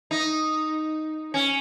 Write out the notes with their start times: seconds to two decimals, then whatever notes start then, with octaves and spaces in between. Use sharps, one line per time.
0.11 D#4
1.34 C#4